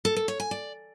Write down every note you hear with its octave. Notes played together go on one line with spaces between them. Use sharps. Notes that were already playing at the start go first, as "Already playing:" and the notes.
A4
A4
C#5
G#5
D5